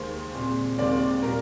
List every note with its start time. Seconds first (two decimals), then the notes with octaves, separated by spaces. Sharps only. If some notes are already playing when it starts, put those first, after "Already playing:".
Already playing: D#2 D#3 G#3 C5
0.34 A#2 G#3 C4
0.79 D#2 D#3 G#3 C4 D5
1.22 A#2 G3 A#3 A#4